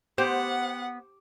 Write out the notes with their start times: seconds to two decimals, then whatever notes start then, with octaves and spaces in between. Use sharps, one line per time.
0.18 B3 G4 C5 F#5